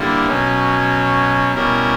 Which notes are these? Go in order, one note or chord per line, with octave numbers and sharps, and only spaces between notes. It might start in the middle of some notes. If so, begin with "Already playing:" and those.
Already playing: D3 G3 A#3 E4
B2 F#3 C#4
B2 G3 C#4 E4 A#4